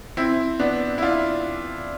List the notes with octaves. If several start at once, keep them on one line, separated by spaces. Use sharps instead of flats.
C4 E4
B3 D4
E4
D4 F4